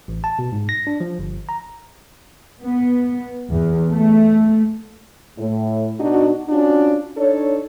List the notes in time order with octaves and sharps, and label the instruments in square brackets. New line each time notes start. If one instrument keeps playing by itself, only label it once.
[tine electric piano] A1
A5
B2
G#2
A#6
D4
F3
G1
A#5
[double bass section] B3
E2
A3
[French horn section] A2
B2 D4 D#4 F#4
C#4 D4 F4 F#4
D4 D#4 A4 C#5